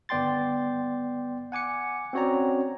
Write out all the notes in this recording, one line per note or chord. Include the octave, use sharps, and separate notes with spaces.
G1 B3 D5 G5 C6 A6
F#5 G#5 D6 C#7
C4 C#4 F#4 C#5 D5 A#5